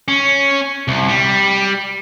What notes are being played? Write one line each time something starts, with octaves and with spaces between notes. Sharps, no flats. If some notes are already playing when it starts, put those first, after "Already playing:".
C#4
C2
G3